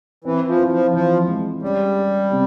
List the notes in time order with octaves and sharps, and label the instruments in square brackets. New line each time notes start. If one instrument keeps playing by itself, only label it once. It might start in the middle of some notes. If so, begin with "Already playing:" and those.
[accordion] E3 [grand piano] C4
[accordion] F3
[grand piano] E4
[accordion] F3
[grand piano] E3 [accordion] F3
[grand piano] G#3
[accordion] G3 [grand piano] C#4
[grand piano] G4
C3